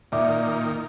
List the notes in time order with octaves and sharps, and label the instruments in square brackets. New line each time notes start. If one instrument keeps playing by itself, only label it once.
[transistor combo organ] A#2 D#3 [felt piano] D5 E5 D6